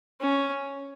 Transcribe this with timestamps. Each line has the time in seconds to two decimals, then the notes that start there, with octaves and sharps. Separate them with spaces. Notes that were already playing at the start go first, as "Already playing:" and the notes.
0.20 C#4